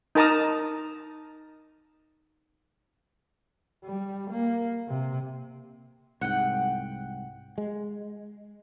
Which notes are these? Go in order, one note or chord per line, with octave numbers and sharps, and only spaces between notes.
D#4 A#4 A5 A#5 D#6
G3
A#3
C3
C2 G#2 F#5 G5
G#3